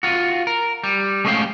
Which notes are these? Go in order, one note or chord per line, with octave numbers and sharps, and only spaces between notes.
F4 F#4
A#4
G3
G#3 A3 C#4 D#5 F5 G5